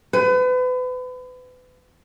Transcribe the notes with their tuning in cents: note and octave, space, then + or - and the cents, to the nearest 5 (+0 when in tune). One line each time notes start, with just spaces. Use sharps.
B4 +35